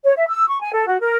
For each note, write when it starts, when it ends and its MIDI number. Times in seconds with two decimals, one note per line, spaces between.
0.04 0.13 73
0.17 0.26 76
0.29 0.46 88
0.49 0.60 85
0.62 0.74 80
0.74 0.85 69
0.86 0.99 66
1.01 1.17 70